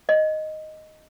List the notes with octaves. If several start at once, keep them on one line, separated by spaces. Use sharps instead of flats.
D#5